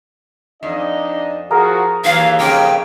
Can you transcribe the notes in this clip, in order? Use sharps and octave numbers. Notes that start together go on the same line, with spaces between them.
F2 D4 D#4 D#5
F3 F#4 G#4 A#4
D#2 E3 F#3 F4 F5
F2 C#3 A#3 G5